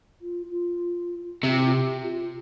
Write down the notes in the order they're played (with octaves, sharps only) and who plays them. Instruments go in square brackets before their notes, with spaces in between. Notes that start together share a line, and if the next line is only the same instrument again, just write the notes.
[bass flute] F4
F4
[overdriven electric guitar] C3 [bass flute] G4
[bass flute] F4
E4
F4
G4
G4
F4